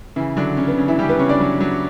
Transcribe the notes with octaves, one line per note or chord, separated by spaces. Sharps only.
C#3 E3 E4
D3 F#3 D4
C#3 C#4
B3
C#3 C#4
E3 E4
C#3 G3 G4
B3 B4
C#3 C#4 C#5
D4 D5
F#3
F#3